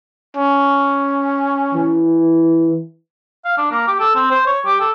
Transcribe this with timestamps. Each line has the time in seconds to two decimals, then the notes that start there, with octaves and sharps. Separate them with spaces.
0.37 C#4
1.74 E3
3.45 F5
3.57 D4
3.71 A#3
3.88 G4
4.00 A4
4.15 C4
4.30 C5
4.47 C#5
4.65 G4
4.80 A4